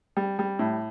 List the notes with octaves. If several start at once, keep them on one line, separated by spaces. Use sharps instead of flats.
G3
G3
A2